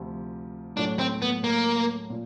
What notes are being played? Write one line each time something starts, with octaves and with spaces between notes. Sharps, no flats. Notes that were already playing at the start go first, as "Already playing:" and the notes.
Already playing: D2 C3 F3
A2 F#3 A3 C#4 D4 F#4
C4
B3
A#3
A#2